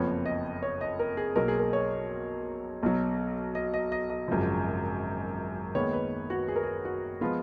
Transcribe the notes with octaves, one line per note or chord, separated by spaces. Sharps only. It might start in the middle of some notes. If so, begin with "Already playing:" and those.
Already playing: F#1 F2 F3 B3 C#5
D#5
C#5
D#5
A#4
G#4
B1 B2 F#3 A#3 A#4
G#4
A#4
C#5
B1 B2 F#3
D#5
D#5
D#5
D#5
G#1 F#2 C#3 F3
D#2 D#3 G#3 B3 C#5
B4
F#4
G#4
A#4
G#4
F#4
F3 G#3 B3 F4